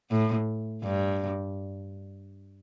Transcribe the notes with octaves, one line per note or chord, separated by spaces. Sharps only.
A2
G2